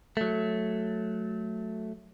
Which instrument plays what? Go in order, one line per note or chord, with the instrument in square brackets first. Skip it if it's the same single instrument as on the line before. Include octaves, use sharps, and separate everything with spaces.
[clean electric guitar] F#3 A3